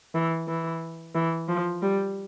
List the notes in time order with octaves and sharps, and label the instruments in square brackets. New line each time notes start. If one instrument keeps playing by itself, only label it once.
[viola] E3
E3
E3
F3
G3